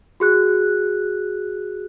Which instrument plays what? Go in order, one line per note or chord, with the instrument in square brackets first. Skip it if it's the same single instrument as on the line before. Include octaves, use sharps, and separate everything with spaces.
[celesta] F#4 G#4 F#6